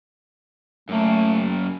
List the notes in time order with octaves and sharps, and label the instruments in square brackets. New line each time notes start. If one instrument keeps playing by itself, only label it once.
[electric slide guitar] F#2 A#3 [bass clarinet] A3